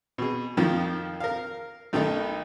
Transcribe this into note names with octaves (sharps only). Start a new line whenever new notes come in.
B2 G#4
F2 D#3 F3
A#4 F5
B1 D#3 A3 D#4